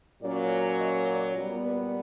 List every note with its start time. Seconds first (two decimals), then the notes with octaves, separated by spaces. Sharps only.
0.22 A#2 F#3 A#3 C#4 D5
0.79 D#5
1.08 D5
1.36 A#2 G3 B3
1.64 D5